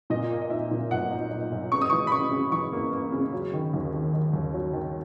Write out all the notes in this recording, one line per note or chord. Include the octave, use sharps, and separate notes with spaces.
A#2 D#5
A#3
D#5
D#4 E5
A#2
B1 F#5
D#4
D#4
B1
C#3 C#6
D#6
E3 C#6
B5
C#3 C#6
C#3
E3 C#6
A#3
A#3
C#3
F#3
D#3
D#2
D#3
D#3
D#2
F#3
D#3